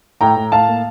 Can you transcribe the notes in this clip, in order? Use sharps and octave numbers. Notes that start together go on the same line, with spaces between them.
A2 G5 A#5
A2
A2 F5 A5
A#3